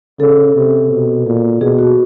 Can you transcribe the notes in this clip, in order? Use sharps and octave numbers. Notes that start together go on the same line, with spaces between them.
C#3 A4
C3
B2
A#2
B2 G#4
F#4